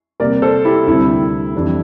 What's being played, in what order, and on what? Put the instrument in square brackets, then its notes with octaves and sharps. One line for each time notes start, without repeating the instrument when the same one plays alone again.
[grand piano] C3 G3 A#3 A#4 D5
A4 C5
E4 G4
D2 C3 G3 C4 E4
F2 E3 G3 D4